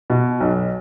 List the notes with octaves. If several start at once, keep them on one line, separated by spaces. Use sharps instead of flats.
B2
B1